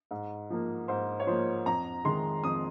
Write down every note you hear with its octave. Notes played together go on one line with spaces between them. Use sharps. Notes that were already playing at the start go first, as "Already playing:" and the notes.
G#2
F3 A#3
G#2 C5
C#5
F3 A#3 C5
F2 A#5
D#3 G#3 C6
F2 D#6